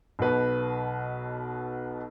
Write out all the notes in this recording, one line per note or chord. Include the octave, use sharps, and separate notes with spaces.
B1 B2 B4